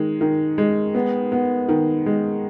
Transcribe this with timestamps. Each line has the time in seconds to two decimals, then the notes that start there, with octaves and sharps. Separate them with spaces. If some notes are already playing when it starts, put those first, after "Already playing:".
Already playing: D#3 G#3
0.21 D#3
0.58 G#3
0.95 B3
1.32 B3
1.69 D#3
2.06 G#3